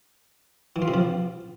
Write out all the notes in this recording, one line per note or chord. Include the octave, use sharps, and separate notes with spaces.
E3
F4
C3
F3